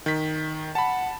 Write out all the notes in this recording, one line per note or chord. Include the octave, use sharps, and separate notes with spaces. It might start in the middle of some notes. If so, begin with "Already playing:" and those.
D#3 B6
F#5 A5 B5